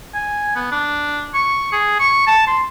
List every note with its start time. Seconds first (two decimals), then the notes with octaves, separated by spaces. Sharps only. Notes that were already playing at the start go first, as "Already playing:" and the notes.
0.14 G#5
0.56 B3
0.71 D4
1.34 C#6
1.72 G#4
2.00 C#6
2.27 A5
2.47 C6